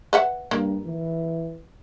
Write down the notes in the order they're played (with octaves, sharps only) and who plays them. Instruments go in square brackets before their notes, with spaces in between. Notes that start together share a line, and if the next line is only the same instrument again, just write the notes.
[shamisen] B4 E5 F#5
[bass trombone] G2 [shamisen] A#3
[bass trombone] E3